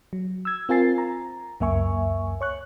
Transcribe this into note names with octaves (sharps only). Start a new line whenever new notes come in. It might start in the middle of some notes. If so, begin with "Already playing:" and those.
F#3
E6 G#6
C4 F4 A#4 G#5 A6 C7
A#5
C#2 F#2 A#3 E5 G#5 C#6
C#5 C#6 F#6